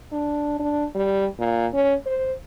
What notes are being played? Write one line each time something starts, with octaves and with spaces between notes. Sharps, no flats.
D4
D4
G3
A#2
C#4
C5